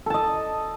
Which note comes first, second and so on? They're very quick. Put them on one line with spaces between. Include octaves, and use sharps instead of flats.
A4 A5 D#5